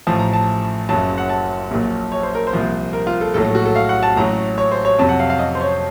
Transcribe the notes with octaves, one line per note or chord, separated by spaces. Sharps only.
A1 A2 F3 A5
A#5
A5
F#1 F#2 C#3 F#3 A5
F#5
A5
A#1 A#2 F#3
C#5
C5
A#4
C5
C2 A#2 F3
A#4
F4
A4
A#1 A2 F#3 A4
A4
F#4
A4
F5
F#5
A5
A1 A2 F#3 A#5
C#5
C5
C#5
F2 C3 F#3 A5
F#5
F5
F5
D#5
C5
C#5